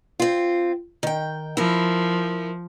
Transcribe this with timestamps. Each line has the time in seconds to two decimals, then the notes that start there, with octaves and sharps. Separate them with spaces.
0.19 C4 F4
1.03 D#3 G5
1.57 F3 E4 A#4